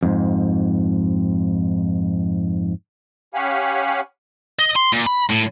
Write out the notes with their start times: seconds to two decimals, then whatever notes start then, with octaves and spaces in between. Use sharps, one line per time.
0.03 F2 G#2
3.34 C#4 G4 F5 F#5 G#5 B5
4.59 D#5
4.76 C6
4.93 A#2
5.07 B5
5.30 A2